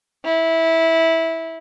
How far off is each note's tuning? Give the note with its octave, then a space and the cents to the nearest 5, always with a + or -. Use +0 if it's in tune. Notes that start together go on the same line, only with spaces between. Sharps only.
E4 -15